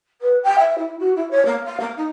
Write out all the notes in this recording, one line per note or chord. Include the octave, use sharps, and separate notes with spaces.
B4
G5
E5
E4
F#4
E4
C#5
A#3
F5
A#3
D#4